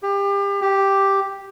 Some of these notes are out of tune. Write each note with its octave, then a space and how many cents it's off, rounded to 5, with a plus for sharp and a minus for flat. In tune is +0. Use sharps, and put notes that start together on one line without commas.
G4 +30
G4 +0